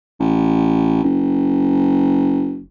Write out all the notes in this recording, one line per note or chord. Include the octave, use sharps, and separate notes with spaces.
A1
F#1